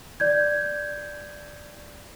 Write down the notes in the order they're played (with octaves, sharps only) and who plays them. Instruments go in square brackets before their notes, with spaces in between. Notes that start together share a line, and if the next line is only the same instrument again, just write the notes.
[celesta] D5 G6 G#6